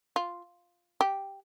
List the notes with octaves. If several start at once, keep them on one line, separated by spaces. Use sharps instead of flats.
F4
G4